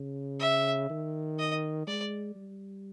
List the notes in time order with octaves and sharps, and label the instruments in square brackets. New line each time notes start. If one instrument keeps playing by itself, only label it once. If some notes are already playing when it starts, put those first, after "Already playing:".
Already playing: [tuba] C#3
[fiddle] E5
[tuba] D#3
[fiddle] D#5
[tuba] G#3 [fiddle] D5
[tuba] G3